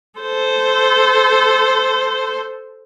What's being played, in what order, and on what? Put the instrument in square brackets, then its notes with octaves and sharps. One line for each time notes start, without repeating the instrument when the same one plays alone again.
[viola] A4 C5